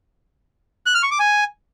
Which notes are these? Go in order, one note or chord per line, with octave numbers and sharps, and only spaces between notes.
F#6
F6
C#6
D6
G#5